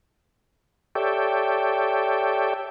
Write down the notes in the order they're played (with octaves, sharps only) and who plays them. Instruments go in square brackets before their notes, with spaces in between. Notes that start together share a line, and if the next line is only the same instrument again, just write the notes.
[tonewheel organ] G4 A4 C#5 D5 E5 G5